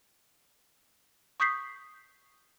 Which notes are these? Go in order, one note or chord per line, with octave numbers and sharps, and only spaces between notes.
C#6 D#6 G6 B6 C7